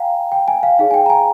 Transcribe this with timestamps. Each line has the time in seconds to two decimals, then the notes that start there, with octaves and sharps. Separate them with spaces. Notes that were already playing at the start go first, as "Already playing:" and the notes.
Already playing: F5 G5 G#5 A#5
0.32 G5
0.48 G#5
0.63 F5
0.79 D#4 G#4 C#5 F5
0.91 G#5
0.94 G5
1.06 A#5
1.10 G#5